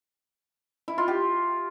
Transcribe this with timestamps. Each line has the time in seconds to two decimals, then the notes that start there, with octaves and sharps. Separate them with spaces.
0.88 E4
0.98 F4
1.08 G4